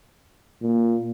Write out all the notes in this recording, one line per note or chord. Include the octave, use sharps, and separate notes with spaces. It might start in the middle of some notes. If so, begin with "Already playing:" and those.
A#2